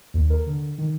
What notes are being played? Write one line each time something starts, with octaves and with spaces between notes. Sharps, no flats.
D#2
A#4
D3
D#3